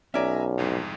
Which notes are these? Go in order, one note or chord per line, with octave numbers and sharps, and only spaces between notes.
B1 C#4 D5 E5 G#5 A#5
C2 F2 G#2